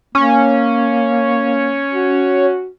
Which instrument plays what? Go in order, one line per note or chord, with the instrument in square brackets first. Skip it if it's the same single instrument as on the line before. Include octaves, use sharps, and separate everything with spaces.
[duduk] A#3 [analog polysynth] C#4
[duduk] F#4